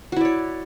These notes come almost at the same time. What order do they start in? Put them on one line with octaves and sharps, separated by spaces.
F#4 E4 D5 C#5